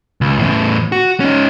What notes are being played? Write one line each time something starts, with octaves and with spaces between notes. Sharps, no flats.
C#2
E2 A2
F#4
C#4 D#4